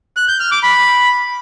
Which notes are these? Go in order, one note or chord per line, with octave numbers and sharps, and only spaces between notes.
F#6
G6
F6
D6
B5